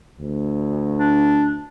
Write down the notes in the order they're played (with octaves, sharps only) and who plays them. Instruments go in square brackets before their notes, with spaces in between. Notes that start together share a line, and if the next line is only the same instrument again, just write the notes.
[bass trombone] D2
[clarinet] D4